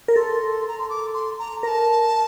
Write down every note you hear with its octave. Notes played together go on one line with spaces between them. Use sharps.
A#4
A4 C6
A#5
C6
D6
C6
A#5
A#4 A5 A#5